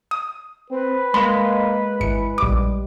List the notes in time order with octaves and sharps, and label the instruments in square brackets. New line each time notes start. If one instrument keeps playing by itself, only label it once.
[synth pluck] D#6
[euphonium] C4 [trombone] B4
[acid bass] G#3 [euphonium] A#3 [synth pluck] B5
[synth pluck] G#1 C#7 [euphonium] E3
[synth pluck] A#1 D6 [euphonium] G3